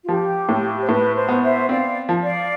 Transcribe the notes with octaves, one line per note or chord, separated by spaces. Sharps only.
F4
F3 G4
A2
C5
A2 B4
C5
B3
C5 E5
C4 D5 F5
F3
D5 F5